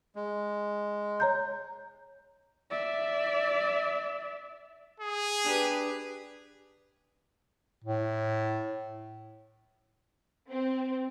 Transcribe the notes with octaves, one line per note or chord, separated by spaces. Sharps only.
G#3
C#5 A#5 G6
D5 E5
G#4
D4 G4 B4
A2
C4